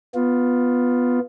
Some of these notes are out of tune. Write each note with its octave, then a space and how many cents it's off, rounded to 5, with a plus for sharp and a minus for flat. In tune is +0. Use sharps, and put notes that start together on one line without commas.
B3 +0 F4 +10